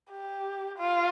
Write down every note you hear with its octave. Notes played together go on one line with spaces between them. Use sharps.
G4
F4